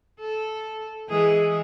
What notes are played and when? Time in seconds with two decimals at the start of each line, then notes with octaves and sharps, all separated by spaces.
0.19 A4
1.09 E3 G#3 G#4